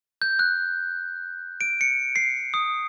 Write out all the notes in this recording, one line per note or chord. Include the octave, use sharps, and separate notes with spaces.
G6
F#6
D7
C#7
C7
D#6